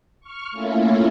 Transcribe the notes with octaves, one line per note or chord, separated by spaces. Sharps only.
C#6 F6
A3 A#3 C#4 E4 F4